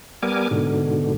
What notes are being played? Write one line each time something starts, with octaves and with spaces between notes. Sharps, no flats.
G3 B3 A#4 G#5 D6
G#2 B2 D3